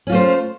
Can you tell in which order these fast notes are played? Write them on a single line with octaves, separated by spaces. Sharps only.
C#4 F4 A3 C5